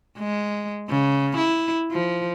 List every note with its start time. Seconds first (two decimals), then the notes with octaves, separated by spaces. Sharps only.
0.19 G#3
0.89 C#3
1.38 E4
1.92 F3